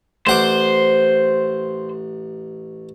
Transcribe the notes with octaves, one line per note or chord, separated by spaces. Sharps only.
A1 C5 F#5 D6